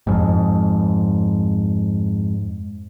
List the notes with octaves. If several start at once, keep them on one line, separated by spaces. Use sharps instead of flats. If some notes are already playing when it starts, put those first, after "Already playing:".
F2 G#2